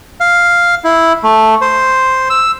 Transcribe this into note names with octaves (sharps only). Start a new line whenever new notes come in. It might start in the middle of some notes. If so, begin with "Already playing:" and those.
F5
E4
A3
C5
E6